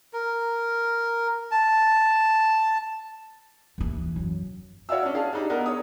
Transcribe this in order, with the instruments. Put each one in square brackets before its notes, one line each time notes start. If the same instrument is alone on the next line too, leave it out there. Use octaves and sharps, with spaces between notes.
[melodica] A#4
A5
[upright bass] D#2 E3
F#2
[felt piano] F#4 C#5 D5 E5 F5 E6
C#4 D4
C#4 G#4 F5 A5
D4 D#4 G4
B3 G#4 A#4 D#5
C#5 D#6